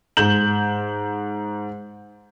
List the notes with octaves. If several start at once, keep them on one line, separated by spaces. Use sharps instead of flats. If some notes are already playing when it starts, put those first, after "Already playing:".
G#2 G6 E7 F#7